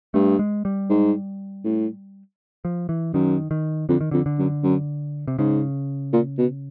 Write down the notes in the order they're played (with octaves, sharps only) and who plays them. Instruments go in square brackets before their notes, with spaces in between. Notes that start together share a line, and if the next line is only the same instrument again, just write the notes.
[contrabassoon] G2 [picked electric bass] A3
[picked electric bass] G#3
G3
[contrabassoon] G#2
A2
[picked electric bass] F3
E3
[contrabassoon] F#2 [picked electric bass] D#3
[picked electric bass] D#3
[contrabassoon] F2 [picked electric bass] D3
[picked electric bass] D#3
[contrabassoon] F2 [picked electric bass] D3
[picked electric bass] D3
[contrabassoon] F#2
F#2
[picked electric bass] C3
[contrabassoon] G#2 [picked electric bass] C#3
[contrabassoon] A#2
B2